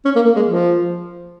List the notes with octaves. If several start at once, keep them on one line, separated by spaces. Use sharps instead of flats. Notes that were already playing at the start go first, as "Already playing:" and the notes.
C#4
A#3
A#3
G#3
F3